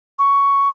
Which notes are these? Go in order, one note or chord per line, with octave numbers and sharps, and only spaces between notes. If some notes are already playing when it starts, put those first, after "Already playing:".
C#6